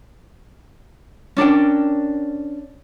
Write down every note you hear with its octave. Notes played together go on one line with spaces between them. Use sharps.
C#4 D4 A#4 G5